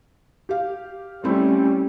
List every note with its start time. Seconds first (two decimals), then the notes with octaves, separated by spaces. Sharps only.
0.49 G4 F5
1.24 G3 A3 C4 C#4 E4